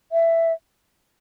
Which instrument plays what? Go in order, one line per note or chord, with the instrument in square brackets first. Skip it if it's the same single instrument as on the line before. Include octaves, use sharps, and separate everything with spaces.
[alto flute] E5